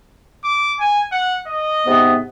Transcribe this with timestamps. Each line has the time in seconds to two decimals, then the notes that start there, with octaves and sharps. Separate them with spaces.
0.44 D6
0.80 G#5
1.12 F#5
1.47 D#5
1.86 G#2 C3 B3